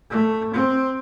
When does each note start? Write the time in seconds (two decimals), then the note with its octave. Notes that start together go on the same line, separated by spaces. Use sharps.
0.10 A3
0.53 C4